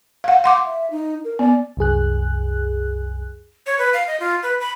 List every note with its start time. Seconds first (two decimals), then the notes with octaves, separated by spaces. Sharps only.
0.24 F5 F#5
0.44 F#5 C6 D6
0.65 E5
0.91 D#4
1.25 A#4
1.39 B3 D5
1.77 C2 F#2 G#4 F#6
3.66 C#5
3.79 B4
3.93 F5
4.07 D#5
4.20 F4
4.43 B4
4.60 B5